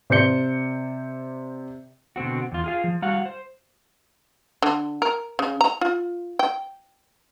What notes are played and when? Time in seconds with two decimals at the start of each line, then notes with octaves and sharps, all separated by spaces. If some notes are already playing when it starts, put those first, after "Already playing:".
0.10 C3 C5 D5 G6 C#7 G7
2.16 B2 D3 C4 F#4
2.52 E2 F4
2.64 F4 G#4 F5
2.84 F3
3.02 G3 F#4 F5 F#5
3.25 C5
4.62 D3
5.02 A#4
5.39 C#3
5.61 A#5
5.81 F4
6.39 G5